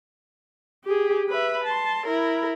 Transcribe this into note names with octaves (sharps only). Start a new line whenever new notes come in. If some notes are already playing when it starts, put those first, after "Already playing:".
G4 G#4
B4 E5
A5 C6
E4 A#4